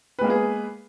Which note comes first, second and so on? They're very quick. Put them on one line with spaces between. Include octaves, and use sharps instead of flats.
B4 G#3 A#3 B3 G#4